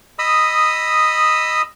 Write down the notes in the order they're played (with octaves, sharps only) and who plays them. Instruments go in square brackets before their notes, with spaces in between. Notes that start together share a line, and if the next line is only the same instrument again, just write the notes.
[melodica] D#5 B5 D#6 E6